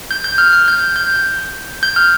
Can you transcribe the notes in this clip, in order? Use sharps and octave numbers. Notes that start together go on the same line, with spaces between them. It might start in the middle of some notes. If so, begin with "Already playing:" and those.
G6
G6
F6
F6
G6
G6
G6
F6